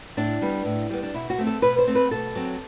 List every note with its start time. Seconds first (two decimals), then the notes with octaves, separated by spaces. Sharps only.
0.17 A2 D4
0.42 G3 B3
0.65 A2
0.90 G3 B3
1.03 D4
1.14 B2 E4
1.30 F#4
1.38 A3 C4
1.47 A4
1.62 B2 B4
1.78 C5
1.87 A3 C4
1.95 B4
2.11 B2 A4
2.35 F#3 C4